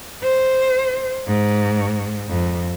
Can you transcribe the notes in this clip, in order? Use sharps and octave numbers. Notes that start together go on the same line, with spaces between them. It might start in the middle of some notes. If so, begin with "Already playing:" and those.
C5
G#2
F2